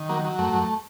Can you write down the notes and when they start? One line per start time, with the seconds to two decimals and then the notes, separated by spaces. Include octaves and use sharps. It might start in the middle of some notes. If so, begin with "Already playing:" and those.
Already playing: D#3
0.09 F#3 A#3
0.24 F#3
0.38 F#2 A3
0.53 F#2